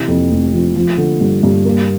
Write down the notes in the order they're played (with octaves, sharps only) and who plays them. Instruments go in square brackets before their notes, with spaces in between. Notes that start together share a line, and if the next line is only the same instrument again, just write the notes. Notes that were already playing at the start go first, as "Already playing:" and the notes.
Already playing: [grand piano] C3 E3
F2
F1
F3
F3
D3
G2
G2
A#3